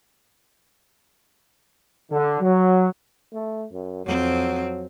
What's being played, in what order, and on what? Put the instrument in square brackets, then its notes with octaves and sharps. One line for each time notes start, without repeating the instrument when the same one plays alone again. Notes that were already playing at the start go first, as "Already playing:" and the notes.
[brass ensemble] D3
F#3
[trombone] A3
F#2
[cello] F2 C4 [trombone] F#3